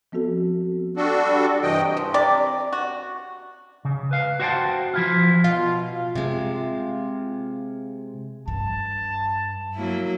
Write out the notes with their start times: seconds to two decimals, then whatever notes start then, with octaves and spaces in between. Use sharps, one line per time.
0.12 F3 B3 C4 F#4 A4
0.97 G3 D4 F#4 A4
1.63 G2 C3 E3 D#5 G5
1.97 F3
2.14 C3 D5
2.73 F#4
3.85 C#3
4.11 B4 F5
4.40 F#4 C5 C#5 F#5 G5 A5
4.94 F3 E4 F4
5.44 B2 F4
6.15 C3 G#3
8.48 G2 A5
9.74 F#3 A#3 E4